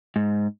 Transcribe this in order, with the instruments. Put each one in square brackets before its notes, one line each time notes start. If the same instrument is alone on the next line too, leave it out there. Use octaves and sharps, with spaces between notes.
[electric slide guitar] G#2